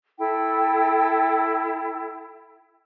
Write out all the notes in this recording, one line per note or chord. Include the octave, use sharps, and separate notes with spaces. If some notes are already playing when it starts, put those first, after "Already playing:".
E4 A4 G5